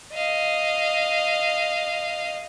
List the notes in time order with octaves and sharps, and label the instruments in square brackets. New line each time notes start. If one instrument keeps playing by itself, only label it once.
[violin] D#5 F5